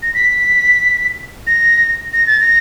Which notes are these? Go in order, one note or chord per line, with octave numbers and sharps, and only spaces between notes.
A#6
B6
A#6
A#6
A6
A#6